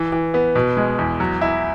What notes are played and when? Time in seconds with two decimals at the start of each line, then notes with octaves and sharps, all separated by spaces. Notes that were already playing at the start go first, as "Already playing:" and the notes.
Already playing: E3
0.12 E3
0.34 B3
0.55 B2
0.77 G#3
0.99 E2
1.20 F#3
1.41 E4